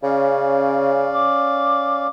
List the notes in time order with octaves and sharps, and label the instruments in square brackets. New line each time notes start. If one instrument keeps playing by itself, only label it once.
[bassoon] C#3 [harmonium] C#4 D5 F5
[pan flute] D6